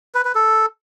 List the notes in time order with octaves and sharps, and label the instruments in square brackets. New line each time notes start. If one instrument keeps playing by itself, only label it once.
[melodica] B4
B4
A4